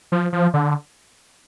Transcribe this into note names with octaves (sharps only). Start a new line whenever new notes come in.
F3
F3
D3